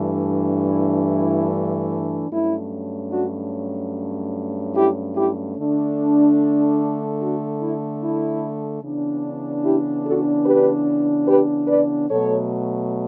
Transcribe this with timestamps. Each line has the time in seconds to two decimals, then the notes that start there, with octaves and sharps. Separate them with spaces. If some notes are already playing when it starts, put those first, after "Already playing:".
Already playing: G2 E3 A3 D4
0.67 E4
1.07 E4
2.30 G2 F#3 A3 C#4 E4
3.11 D4 F#4
4.74 E4 G4
5.15 E4 G4
5.56 D3 A3 D4
7.19 D4 F#4
7.61 E4
8.01 E4
8.83 C#3 E3 B3 D4
9.64 E4 G4
10.04 F#4 A4
10.46 G4 B4
11.27 G4 B4
11.68 B4 D5
12.09 B2 F#3 A3 A4 C#5